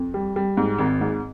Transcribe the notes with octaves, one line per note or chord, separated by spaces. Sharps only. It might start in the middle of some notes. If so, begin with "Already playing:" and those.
Already playing: F2
G3
G3
G#2
G#1
G#2